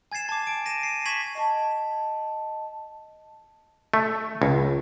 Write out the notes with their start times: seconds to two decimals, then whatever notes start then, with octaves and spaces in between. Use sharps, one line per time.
0.12 G#5 G#6 A6 C7 E7
0.29 A5 D6
0.47 D7
0.66 A#6 D#7 E7
0.83 C7
1.05 C#6 G#6 B6 E7 F#7
1.35 D#5 A5
3.94 A3
4.42 C#2